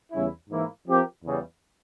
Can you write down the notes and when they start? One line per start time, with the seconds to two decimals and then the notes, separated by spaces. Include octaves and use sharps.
0.12 E2 C#3 G3 C#4 E4
0.50 G#2 E3 A#3 E4
0.88 F3 C4 G4 A#4
1.25 E2 C#3 G3